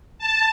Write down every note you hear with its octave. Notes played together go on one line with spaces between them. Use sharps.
A5